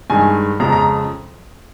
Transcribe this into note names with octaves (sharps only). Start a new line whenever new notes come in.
G2 D#3 G#3 G#5
F2 C#3 F3 G#3 A#5
A#5